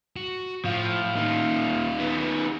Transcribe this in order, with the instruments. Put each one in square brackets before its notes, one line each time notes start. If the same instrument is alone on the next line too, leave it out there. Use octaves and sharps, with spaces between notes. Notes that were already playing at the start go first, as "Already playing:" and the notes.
[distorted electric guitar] F#4
[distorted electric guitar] A2 [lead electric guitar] F3 [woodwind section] F5
[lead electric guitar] A#2 D#3 [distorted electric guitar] D#4 F4
[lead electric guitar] D#3 B3